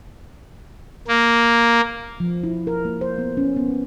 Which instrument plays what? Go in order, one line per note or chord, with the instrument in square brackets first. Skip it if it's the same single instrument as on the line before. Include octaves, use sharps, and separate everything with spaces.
[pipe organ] A#3
[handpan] F3
E4
A#4
A#3
C5
B3
C#4
B3